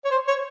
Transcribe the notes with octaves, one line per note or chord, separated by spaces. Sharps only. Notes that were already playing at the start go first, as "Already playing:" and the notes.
C#5
C5
C#5